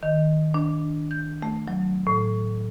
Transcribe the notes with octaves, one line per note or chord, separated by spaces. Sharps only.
D#3
D4
G6
A3
F#3
A2